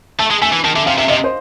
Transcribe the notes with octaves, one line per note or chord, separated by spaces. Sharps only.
A3 A5
G#3
A3 G#5
E3
D#3 A5
D3 E5
C3 F5
C3 E5
C3 D#5
C5